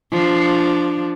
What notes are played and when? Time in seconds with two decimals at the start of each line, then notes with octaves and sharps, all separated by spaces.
0.11 F3 D4